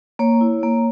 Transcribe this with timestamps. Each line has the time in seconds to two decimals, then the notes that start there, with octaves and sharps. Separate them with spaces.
0.19 A#3 C#5
0.41 E4
0.63 A#3